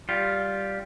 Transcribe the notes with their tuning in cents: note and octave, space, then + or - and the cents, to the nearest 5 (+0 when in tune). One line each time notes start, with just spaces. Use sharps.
G3 -5 F4 +0